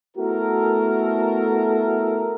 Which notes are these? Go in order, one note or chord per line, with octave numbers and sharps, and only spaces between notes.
A3 B3 E4 F#4 A4 A#4